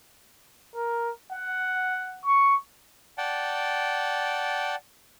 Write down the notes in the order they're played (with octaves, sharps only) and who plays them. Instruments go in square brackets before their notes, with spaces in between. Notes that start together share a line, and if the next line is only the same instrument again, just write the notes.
[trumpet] A#4
F#5
C#6
[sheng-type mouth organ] D5 F#5 G5 A5